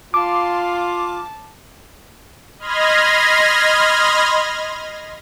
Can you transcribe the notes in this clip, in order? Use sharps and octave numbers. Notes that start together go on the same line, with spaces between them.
F4 A5 C6 D6
A5
D#5 B5 C6 F6 G#6 A#6